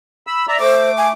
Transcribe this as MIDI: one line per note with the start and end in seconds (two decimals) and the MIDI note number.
0.27 0.46 83
0.27 0.46 88
0.48 0.58 74
0.48 0.58 76
0.48 0.58 82
0.60 1.12 57
0.60 0.91 72
0.60 1.12 86
0.97 1.07 80